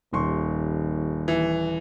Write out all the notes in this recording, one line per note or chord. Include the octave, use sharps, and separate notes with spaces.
D#1 D#2 C6 C#6
E3